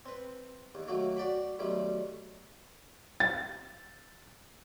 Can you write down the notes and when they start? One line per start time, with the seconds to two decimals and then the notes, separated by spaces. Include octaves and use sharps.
0.06 C4 B4
0.75 D#2
0.88 D#3 F#3 A3 A#3
1.17 F#4 D5 G5 B5
1.59 B1 D#3 G3 A3
3.20 A6